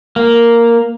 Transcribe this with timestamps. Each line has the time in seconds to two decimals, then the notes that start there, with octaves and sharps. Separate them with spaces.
0.16 A#3